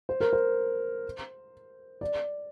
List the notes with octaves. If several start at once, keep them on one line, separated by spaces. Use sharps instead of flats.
C5
A#4
C5
D5